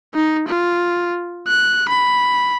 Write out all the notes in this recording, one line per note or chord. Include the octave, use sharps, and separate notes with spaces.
D#4
F4
F#6
B5